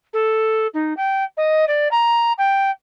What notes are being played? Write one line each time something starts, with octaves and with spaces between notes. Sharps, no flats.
A4
D#4
G5
D#5
D5
A#5
G5